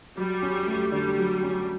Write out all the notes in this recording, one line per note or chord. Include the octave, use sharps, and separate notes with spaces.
F#3 G3
C#4
A3
D3 G3
F#3
C#4